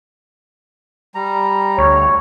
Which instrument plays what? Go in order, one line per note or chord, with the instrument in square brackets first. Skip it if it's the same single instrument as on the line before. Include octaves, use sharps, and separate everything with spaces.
[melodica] G3 A#5
[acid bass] D2 [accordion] C#5